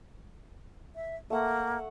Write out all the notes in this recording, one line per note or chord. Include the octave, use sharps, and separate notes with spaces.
E5
A3 A#3 F#5